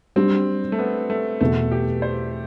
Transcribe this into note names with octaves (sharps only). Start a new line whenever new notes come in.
G3 C4 D4 G4
A3
B3
A3
E2 B2 A3 B3
G4
C5